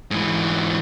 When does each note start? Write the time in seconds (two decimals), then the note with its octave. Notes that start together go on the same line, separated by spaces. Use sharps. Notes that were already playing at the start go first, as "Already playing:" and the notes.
0.11 G#2 E3